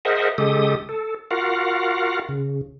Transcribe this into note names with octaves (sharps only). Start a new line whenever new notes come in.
G#4 A#4 C5 D#5 E5 F#5
C#3 G#3 G4 A4 D#6
A4
F4 F#4 A#4 F5 F#5
C#3